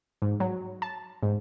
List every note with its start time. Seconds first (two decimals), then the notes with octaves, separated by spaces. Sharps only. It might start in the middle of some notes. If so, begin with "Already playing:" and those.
0.22 G#2
0.40 F#3
0.82 A5
1.23 G#2